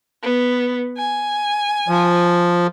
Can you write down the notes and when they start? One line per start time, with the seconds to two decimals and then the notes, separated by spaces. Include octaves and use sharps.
0.23 B3
0.97 G#5
1.88 F3